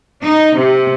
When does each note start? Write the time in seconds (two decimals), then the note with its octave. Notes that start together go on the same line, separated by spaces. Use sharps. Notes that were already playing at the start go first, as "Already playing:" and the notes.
0.22 D#4
0.56 C3